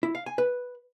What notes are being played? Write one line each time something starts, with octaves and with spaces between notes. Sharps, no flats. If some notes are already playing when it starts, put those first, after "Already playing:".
E4
F5
G#5
B4